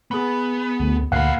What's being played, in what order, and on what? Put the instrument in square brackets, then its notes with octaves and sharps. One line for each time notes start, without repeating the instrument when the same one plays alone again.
[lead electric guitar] B3 [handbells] G#4 B5
[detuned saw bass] D2
[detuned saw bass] D2 [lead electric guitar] A#2 B5 [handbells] F5 F#6 C7 [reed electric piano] F#5